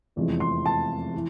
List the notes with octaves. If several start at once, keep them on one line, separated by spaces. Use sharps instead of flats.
F1 E2 C3 F3 G#3
C6
A5
E3